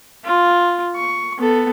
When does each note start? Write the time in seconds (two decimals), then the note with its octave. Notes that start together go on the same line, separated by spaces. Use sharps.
0.25 F4
0.96 C#6
1.39 B3 A4